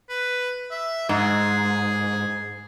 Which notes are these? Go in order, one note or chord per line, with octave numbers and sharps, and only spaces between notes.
B4
E5
G#2 G#4